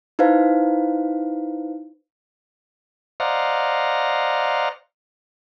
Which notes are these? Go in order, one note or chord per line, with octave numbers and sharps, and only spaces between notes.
D#4 E4 B4 C5 F5
C5 D5 D#5 F5 F#5 A#5